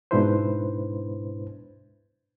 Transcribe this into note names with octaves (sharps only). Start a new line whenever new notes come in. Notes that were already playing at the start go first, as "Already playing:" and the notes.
G#2 B2 D4 E4 B4 C5